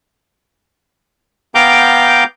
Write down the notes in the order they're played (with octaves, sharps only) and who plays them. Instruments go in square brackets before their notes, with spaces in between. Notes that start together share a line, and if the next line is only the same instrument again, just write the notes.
[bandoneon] B3 F5 G5 A#5 D6 G6